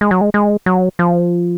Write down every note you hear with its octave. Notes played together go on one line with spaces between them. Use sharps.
G#3
F#3
G#3
G#3
F#3
F3